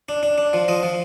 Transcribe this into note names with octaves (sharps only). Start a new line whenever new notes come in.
D4
D4
D4
F3
F3 D#5
F3